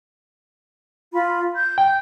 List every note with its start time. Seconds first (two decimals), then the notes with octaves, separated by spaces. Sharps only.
1.13 F4 B5
1.55 G6
1.78 G5